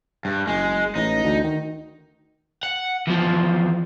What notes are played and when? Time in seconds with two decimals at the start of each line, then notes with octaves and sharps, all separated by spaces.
0.25 G2
0.47 F#1 G#3
0.95 A1 D#4
1.24 D2
1.44 D#3
2.63 F#5
3.08 E2 F3